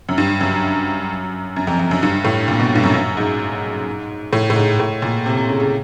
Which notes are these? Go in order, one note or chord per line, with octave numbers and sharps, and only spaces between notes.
F#2
G2
F#2
F#2
F2
F2
F#2
G2
A2
A#2
B2
G2
F#2
F#2
G#2
A2
A2
G#2
A2
A#2
C3
C3
C#3
C#3